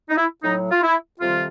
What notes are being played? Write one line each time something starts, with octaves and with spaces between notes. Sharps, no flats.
D#4
E4
A2 F#3 D#4
F4
E4
F2 C3 D#3 G3 F4